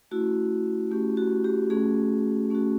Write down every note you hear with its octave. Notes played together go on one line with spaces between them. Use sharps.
A3 C#4 E4 F#4
A3 C#4 E4 G4
F#4
G4
A3 C#4 F#4 G#4
A3 C#4 F#4